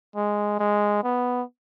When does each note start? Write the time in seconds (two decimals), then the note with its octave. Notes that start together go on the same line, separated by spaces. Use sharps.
0.16 G#3
0.59 G#3
1.04 B3